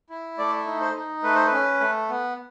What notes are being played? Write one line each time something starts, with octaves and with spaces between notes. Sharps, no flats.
E4
A3 D5
D#4
C5
D#4
A3 B4
C5
B4
C#4
A3
B3